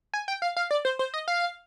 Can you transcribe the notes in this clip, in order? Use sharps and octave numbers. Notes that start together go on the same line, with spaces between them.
G#5
G5
F5
F5
D5
C5
C5
D#5
F5